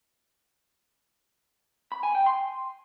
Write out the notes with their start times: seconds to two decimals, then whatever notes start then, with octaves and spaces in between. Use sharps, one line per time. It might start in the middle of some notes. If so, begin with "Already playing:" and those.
1.92 B5
2.03 G#5
2.15 G5
2.26 C6